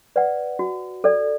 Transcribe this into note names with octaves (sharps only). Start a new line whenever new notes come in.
B4 D5 F#5
F#4
A4 D5